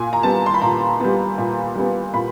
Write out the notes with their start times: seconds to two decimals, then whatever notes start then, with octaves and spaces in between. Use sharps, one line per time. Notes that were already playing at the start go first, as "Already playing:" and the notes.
Already playing: A#2 G#5
0.13 A#5
0.23 G3 B3 A5
0.46 C6
0.54 B5
0.62 A#2 A#5
1.00 G3 B3
1.38 A#2
1.75 G3 B3
2.14 A#2 B5